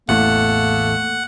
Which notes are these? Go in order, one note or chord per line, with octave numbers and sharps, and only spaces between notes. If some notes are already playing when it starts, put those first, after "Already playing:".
A1 E2 A2 A3 A#3 F#5